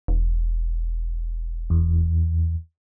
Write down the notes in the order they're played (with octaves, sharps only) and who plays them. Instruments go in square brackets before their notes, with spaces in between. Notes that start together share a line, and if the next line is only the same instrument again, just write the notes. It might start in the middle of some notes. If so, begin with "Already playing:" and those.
[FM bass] E1
[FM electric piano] E2